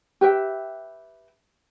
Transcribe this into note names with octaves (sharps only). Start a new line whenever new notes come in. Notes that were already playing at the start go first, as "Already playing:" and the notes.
G4 B4 E5 G5